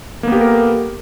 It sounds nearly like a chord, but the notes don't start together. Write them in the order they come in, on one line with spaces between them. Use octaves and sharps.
A#3 B3 G4 A4 A#4